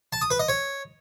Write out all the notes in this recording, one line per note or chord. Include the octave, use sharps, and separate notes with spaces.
A5
D#6
B4
D#5
C#5